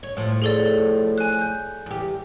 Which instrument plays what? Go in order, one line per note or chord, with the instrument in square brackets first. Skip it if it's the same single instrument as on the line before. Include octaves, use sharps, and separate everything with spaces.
[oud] C#5
A2 F3
[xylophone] G#4 A4 D5
G#5 F#6
G6
[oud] E2 G4